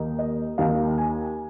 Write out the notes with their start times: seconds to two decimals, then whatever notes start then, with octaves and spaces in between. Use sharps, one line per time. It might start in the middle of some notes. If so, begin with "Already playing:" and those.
Already playing: D#2 D#3 A#3 D#4
0.19 D#5
0.58 D#2 D#3 A#3 D#4 F5
0.98 G#5